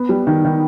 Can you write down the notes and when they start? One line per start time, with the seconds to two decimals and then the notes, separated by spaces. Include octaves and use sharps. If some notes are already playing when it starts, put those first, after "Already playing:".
Already playing: B3
0.09 G3
0.27 D#3
0.45 D#3